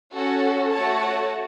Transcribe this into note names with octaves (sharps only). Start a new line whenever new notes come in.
C#4 F#4 A4
A3 F#4 C#5 A5